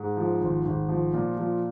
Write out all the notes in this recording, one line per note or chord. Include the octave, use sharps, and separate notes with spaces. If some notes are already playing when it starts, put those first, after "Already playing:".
Already playing: G#2
F3
G#1
G#1
F3
A#2
F3